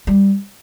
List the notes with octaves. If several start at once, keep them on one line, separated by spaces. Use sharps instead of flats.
G3